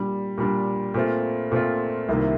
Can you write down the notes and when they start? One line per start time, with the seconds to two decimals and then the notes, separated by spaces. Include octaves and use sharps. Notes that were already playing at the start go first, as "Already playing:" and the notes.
Already playing: A#2 G3 D4
0.38 A#2 G3 D4
0.94 A#2 A3 C4 F4
1.52 A#2 A3 C4 F4
2.09 C2 C3 D#3 A#3 F4